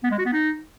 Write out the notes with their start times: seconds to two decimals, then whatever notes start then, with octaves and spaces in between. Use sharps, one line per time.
0.04 B3
0.11 G#3
0.18 F#4
0.26 B3
0.33 D#4